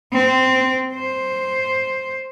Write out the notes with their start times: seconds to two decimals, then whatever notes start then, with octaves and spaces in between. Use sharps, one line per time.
0.12 C4
0.94 C5